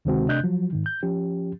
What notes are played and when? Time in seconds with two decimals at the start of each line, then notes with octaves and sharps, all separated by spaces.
0.05 D2 C3 D#3 G#3 C4 F#4
0.28 C3 A3 D4 D#5 F#6 G6
0.44 F3 F#3
0.73 G#2 D#3
0.86 G6
1.03 F3 C#4 G4